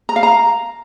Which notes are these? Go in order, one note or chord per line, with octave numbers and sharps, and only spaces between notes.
A#5
F5
A#5